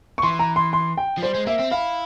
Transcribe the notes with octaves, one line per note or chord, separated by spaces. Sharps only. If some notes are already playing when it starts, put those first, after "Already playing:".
C#6
E3 C6
A#5
C6
C6
G5
F3
G3 C5
G#3
A#3 E5
C4
E4 F5